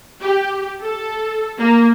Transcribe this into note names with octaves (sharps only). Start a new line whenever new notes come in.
G4
A4
A#3